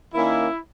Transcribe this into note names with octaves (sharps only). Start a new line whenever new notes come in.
D#3 A#3 C#4 E4